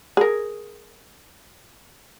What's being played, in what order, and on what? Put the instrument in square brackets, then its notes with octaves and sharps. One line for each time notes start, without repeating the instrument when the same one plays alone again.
[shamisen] G#4 A#4